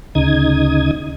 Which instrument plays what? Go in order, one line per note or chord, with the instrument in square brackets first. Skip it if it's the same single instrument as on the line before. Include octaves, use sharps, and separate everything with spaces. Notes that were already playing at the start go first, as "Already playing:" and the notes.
[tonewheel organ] D2 C#3 D#4 D#6 G#6